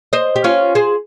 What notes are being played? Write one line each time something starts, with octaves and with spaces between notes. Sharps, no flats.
C5 D#5
G4
C#4 F4
G#4 C5